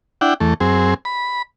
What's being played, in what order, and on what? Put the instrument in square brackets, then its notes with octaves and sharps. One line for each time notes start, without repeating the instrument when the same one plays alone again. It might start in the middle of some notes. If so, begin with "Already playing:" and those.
[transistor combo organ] D4 E4 F#5 G5
E2 A3
F#2 C4 G#4
B5